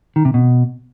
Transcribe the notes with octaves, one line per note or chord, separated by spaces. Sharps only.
D#3
C3
B2